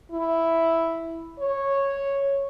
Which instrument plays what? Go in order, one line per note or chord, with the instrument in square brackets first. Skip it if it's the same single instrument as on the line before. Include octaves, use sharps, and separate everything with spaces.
[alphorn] E4
C#5